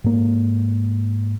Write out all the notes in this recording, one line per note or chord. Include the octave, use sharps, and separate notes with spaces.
G#2 A#3